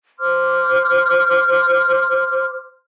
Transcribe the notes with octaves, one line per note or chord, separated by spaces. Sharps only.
C5 C6 D6 F6